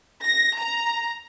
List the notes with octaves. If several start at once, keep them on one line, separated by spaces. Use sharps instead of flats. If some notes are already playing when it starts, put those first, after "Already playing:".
A#6
A#5